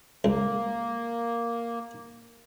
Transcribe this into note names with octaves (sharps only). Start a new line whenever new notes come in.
C#2 A#3